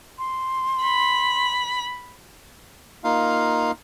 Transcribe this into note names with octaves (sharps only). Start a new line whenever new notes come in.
C6
B5
A#3 D#4 F4 F5